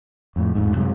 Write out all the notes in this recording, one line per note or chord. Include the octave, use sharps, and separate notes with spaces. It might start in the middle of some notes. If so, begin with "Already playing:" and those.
F2 A2
A1 E2 G#2
F#2 C3 F#3 G#3